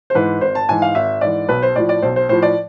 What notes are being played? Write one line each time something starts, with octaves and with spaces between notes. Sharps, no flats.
C5
G#2 E3 B4
G#1 C5
A5
G#2 E3 G#5
F5
G#1 E5
G#2 E3 D5
B1 B4
C5
A2 F3 D5
D5
B1 C5
C5
A2 F3 C5
D5